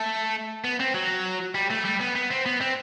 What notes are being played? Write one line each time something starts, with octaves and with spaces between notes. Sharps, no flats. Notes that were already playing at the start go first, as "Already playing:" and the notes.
Already playing: A3
B3
C4
F#3
G3
A3
G3
B3
B3
C4
B3
C4